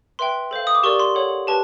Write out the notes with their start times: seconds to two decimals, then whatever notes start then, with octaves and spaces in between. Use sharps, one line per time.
0.19 B4 E5 G5 C6
0.51 A4 C5 F5
0.67 D#6
0.75 D6
0.83 G4 A#4 D5 C#6
1.00 C6
1.15 A4 C#5 F#5
1.47 G4 B4 A5